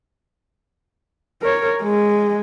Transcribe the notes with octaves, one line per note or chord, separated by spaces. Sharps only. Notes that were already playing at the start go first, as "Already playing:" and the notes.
A#4 C#5
G#3